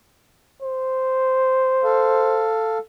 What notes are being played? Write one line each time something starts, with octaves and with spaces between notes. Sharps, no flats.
C5
A4 F5